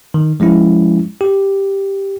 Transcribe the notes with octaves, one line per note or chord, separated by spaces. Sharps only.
D#3
F3 G#3 C#4 E4
G4